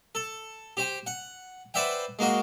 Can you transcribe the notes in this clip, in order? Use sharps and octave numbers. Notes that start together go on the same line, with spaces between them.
A4
G4 C5 G5
F#5
B4 C5 D5 E5 F#5 G5
G#3 A#3 F#4 D#5